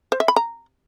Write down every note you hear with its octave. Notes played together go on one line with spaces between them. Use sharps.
C5
E5
B5
A#5